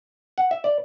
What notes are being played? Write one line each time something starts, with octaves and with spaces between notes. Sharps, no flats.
F#5
E5
D5